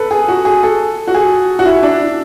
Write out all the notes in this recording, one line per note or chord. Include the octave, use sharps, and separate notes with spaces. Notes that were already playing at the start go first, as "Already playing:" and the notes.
Already playing: A4 B4
G#4
F#4
G#4
A4
F#4
G#4
F#4
E4
D4